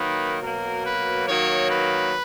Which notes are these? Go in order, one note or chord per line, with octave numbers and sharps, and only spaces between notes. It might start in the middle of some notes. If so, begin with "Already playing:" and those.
Already playing: D#3 F#3 A#3 B4
B2 F#3 A#3 A#4
B4
D#3 F#3 A#3 C#5
B4